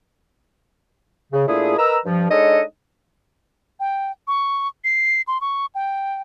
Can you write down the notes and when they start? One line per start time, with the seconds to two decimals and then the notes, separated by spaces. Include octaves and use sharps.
1.33 C#3
1.47 A#2 A3 D4 E4 G#4
1.77 A#4 B4 D#5 A#5 E6
2.05 G2 F3
2.30 G#3 D4 D#4 A4 C#5 D#5
3.80 G5
4.27 C#6
4.84 C7
5.27 C6
5.41 C#6
5.75 G5